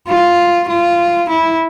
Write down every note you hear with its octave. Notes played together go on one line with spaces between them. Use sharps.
F4
F4
E4